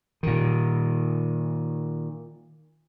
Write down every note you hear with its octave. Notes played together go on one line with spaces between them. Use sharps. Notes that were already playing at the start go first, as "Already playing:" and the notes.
A#2 D#3